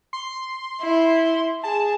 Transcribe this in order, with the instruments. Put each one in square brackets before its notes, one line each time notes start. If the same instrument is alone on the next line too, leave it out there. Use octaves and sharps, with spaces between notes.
[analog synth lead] C6
[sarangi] E4
[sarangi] G#4 [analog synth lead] A5